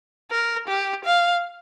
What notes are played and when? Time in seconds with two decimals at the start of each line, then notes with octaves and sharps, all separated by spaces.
0.31 A#4
0.68 G4
1.05 F5